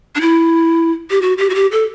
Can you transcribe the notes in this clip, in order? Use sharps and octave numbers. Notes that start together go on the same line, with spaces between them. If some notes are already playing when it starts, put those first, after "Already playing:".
D4
E4
G4
F#4
G4
F#4
G4
A4